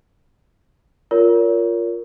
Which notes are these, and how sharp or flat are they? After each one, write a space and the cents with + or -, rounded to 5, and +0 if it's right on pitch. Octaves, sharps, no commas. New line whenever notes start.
F4 +0 A#4 +0 C#5 +30